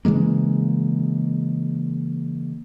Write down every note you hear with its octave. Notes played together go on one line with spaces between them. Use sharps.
C#3 E3 G#3 A#3